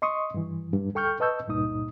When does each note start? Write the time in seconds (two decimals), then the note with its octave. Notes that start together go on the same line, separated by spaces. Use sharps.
0.02 D#5 C6 C#6 D#6
0.34 G2 E3
0.73 G2
0.95 D2 A4 G5 C#6 F6 G6
1.20 B4 D#5 A5 C#6 E6 G6
1.48 C#2 G2 A#2 D#4 D#6